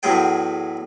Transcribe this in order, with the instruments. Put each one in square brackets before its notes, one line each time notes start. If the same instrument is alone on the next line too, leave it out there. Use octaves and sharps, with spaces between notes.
[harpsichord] E2 A2 F#3 G#4 G5